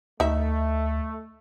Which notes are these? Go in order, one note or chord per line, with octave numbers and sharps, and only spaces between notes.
D2 A3 D#4 E5